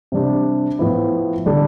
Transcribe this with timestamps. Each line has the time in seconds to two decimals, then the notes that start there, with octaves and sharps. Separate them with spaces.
0.12 C3 G3 D4 G4
0.79 A2 F3 B3 E4
1.46 D3 G3 D4 A4